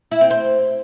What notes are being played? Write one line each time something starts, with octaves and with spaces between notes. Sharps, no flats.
E4
C4
C5